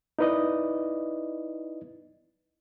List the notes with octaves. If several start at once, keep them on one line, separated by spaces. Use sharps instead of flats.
D#4 E4 B4 D5 D#5